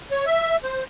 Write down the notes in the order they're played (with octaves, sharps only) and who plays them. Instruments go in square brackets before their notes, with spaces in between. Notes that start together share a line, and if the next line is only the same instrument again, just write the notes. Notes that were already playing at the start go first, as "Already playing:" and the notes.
[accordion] C#5
E5
C5